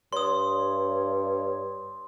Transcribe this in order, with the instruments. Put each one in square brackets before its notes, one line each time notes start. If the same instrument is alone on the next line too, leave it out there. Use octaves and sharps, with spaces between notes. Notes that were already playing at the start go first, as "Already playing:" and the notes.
[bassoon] G2 [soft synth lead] C#5 [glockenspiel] C6 D#6